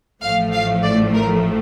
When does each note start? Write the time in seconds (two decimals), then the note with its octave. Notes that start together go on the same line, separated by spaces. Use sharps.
0.23 A1 A2 F3 A3 F5
0.53 F5
0.83 D5
1.14 A#4